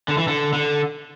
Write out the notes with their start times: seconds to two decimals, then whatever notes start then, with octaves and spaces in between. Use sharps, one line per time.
0.08 D3
0.18 E3
0.28 D3
0.53 D3